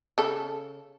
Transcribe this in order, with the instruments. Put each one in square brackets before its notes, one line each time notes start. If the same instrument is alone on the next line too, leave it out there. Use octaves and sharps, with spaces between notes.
[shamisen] C#3 A4